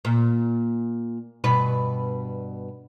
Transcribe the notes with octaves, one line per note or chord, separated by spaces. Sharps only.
A#2
G2 B2 B4